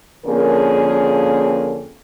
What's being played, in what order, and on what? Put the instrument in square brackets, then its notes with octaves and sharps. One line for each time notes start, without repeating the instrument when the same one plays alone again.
[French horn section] F2 D3 A#3 C#4 G#4 A#4